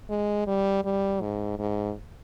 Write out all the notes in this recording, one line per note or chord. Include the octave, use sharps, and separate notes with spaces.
G#3
G3
G3
G#2
G#2